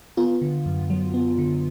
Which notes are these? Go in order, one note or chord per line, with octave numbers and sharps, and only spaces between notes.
B3 F4
D3
F#2
F#3
B3
D3